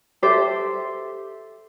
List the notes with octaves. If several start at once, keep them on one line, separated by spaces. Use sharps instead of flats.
G4 A4 C5 E5